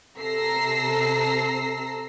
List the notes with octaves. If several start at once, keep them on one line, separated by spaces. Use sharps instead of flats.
C3 A4 A#5 E6 A#6 C7